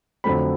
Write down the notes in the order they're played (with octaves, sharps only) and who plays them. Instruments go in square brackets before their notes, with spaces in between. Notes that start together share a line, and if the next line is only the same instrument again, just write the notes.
[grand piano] F2 D3 F#3 A3 C4 B5